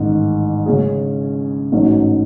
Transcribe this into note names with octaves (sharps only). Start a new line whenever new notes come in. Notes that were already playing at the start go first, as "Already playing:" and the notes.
Already playing: A1 G#2 D#3 G#3
C#3 G#3 C#4 G#4
A1 G#2 F#3 A3 C#4